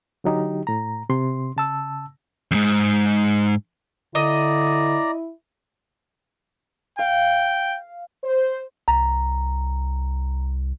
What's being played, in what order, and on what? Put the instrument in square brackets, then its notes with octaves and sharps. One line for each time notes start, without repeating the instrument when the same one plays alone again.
[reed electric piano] D3 F#3 D#4 G4
A2 A#5
C3 C6
C#3 A5 E6
[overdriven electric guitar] F2 G#2
[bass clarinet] D3 [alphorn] E4 [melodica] D5 A#5 [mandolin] D#5
[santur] F5 [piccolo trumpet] G5
[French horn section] C5
[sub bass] C2 [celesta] A#5